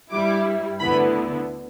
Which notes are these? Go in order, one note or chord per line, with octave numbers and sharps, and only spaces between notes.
G2 G3 E4 D6
D2 D3 B3 E4 B5